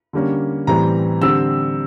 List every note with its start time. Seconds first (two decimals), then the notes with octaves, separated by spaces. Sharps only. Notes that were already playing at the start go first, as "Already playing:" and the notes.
0.13 D3 G3 A#3 C#4
0.67 A2 E3 G3 C4 A#5
1.21 D3 G3 C4 E6